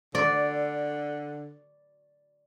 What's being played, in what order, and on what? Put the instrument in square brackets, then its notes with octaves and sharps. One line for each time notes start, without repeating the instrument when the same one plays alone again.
[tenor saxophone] D3 [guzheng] D5